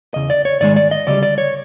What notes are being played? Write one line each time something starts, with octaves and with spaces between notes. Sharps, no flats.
E2 C#3 D#5
D5
C#5
G#2 D#3 G#3 D5
D5
D#5
D2 C#3 G3 D5
D5
C#5